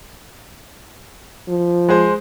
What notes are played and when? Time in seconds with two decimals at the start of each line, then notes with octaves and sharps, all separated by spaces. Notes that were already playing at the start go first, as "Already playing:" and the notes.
1.48 F3
1.89 G#3 G#4 C5